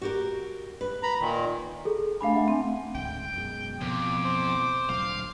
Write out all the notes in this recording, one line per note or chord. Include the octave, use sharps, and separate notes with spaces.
F#4 G4 A#4
B4
A#5 B5
A#2 D#3
G#4 A4
A3 D4 F5 G#5 B5
E5 F#5
C4
A1 D2 G#2 G5
F#2 B2 G#3
A1 F2 B2 B3 D6
C5
D2 A#2 F#3 F5